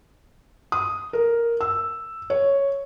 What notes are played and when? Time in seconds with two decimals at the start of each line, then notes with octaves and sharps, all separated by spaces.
0.72 D#6
1.13 A#4
1.61 E6
2.30 C#5